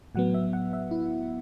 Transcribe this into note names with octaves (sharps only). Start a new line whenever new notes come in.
A2 F#3 B3 F#5
E5
F#5
E5
E4